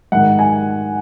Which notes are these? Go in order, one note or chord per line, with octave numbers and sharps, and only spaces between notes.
G#2 D#3 F#5
G#5